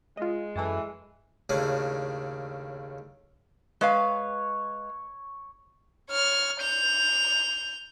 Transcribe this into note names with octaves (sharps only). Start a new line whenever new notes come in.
G#3 F4 D#5
F#2 E3 A4 A5
D#2 A2 C#3 D4 D5
G#3 B4 C#5 F5
C#5 F6
G6 F7